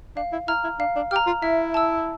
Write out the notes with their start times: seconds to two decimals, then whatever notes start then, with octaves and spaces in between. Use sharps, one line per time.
0.16 D4 F5
0.32 E4
0.48 E4 A#5 F6
0.64 E4
0.79 D4 F5
0.96 D4
1.11 G4 F6
1.16 A#5
1.26 F4
1.42 E4 E5
1.74 A5 E6